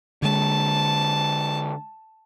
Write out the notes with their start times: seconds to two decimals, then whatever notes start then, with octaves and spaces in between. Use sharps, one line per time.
0.22 D3 G#3 A5